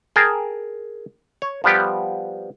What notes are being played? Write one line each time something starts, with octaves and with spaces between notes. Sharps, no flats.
G#4 A#4 G5 A5
C#5
F3 G3 B3 G4